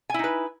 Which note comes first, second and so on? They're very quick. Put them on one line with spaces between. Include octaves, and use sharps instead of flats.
G#5 E4 D#4 B4